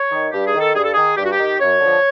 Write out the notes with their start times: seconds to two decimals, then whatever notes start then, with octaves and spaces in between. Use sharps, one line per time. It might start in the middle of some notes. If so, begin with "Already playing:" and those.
Already playing: C#5
0.12 D#3
0.33 G2 G4
0.47 G#4
0.54 D#3
0.61 A4
0.75 G2 G#4
0.85 A4
0.94 D#3 G#4
1.17 G2 G4
1.25 F#4
1.32 G4
1.38 D#3
1.60 F#2 C#5
1.81 D3 F3